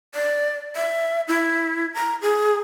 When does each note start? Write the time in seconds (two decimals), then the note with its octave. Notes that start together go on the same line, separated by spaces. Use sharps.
0.15 D5
0.76 E5
1.28 E4
1.94 A#5
2.22 G#4